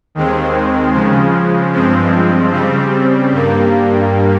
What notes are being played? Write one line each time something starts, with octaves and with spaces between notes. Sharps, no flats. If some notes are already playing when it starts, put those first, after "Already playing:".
D#2 D#3 G#3 C4
C#3 F3 G#3
G2 F3 G#3 C4
C#3 G3 C4
G2 G3 A#3